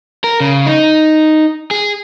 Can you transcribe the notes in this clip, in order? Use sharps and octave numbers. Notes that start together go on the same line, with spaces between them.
A#4
C#3
D#4
G#4